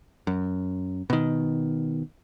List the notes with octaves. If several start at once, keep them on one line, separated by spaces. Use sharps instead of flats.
F#2
B2 D#3